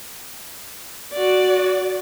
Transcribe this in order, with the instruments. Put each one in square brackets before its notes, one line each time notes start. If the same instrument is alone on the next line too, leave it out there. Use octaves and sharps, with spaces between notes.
[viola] F#4 D5